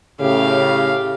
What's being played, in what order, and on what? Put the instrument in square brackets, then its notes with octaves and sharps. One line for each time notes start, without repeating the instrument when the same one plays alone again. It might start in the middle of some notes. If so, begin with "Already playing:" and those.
[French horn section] A2 C#3 [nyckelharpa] G4 F5